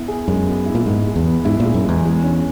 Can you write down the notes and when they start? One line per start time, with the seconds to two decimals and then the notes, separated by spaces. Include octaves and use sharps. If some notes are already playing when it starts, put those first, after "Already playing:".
Already playing: B3 E4
0.08 G#4
0.28 F#2 G#3
0.47 B3
0.66 E4
0.75 A#2
0.86 G#2 G#4
1.06 G#3
1.16 E2
1.25 B3
1.45 G#2 E4
1.60 A#2
1.65 G#4
1.74 F#2
1.84 E2 G#3
2.04 G#3
2.23 C#4